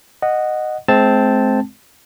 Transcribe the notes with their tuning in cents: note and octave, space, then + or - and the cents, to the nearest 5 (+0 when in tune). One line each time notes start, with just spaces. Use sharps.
D#5 -10 F#5 +0
G#3 +35 C4 +0 A5 +0